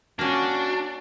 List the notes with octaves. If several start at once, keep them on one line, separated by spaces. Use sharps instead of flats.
A#3 C#4 D4 F#4